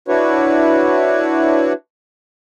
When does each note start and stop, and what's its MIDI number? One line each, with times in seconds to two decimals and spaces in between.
0.08 1.73 62
0.08 1.73 64
0.08 1.73 66
0.08 1.73 71
0.08 1.73 73